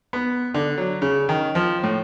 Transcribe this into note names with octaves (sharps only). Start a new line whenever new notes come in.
B3
D3
F#3
C#3
D#3
F3
A2